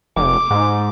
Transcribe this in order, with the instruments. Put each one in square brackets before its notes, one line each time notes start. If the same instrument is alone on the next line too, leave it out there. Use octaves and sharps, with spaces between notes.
[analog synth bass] F1 [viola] D6
[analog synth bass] G#2